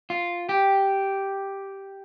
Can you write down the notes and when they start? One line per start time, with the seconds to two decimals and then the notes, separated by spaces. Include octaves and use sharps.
0.10 F4
0.49 G4